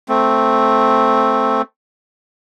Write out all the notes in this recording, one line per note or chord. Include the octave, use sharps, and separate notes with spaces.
A3 C4